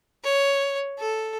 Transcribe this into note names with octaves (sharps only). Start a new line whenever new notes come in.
C#5
A4